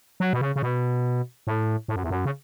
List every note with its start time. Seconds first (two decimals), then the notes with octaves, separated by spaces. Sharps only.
0.20 F#3
0.33 B2
0.41 C#3
0.56 C#3
0.63 B2
1.47 A2
1.88 A2
1.96 F#2
2.03 E2
2.10 F#2
2.25 C#3